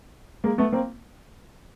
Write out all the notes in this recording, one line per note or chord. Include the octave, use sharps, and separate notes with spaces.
G#3 A#3
A3 B3
A#3 C4